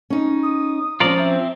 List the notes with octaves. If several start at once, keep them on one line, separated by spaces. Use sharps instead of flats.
C#4 D#4
D#6
F3 C#4 F4 A#4 D5
C4 E5